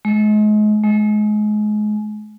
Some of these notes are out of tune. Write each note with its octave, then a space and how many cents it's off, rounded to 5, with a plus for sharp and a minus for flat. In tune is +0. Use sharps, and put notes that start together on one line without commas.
G#3 +35
G#3 +30